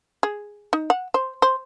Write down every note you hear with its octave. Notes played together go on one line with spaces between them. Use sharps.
G#4
D#4
F#5
C5
C5